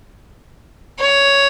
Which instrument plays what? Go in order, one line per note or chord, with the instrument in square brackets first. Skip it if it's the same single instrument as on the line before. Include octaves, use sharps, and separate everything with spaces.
[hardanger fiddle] C#5